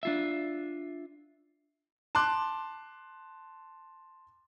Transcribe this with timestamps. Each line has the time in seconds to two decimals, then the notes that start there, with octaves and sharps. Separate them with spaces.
0.03 D4 F4 E5
2.15 A5 C6 D6 F#6